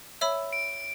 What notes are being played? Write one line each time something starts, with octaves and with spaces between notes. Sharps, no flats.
C#5 E5 B5 E6
D7